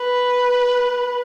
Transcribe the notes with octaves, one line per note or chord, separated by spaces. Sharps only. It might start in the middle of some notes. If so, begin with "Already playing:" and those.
Already playing: B4